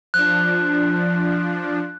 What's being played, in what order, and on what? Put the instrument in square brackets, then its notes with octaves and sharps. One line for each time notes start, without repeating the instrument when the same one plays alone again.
[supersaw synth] F3 D4 [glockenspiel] F#6